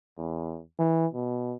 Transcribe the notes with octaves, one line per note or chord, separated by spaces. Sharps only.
E2
E3
B2